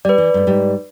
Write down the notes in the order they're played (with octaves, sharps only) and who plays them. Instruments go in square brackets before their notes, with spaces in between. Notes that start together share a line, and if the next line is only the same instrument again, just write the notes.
[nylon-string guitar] G3 [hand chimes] B4 D5
[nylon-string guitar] E3
G2 A3
G#2 G3